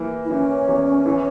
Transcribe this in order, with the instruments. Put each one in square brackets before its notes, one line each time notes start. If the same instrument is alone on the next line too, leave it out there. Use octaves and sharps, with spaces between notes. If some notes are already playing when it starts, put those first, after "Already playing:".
Already playing: [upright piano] E3 A#3
[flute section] E4
[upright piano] E3 [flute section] C#4
[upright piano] E2
E3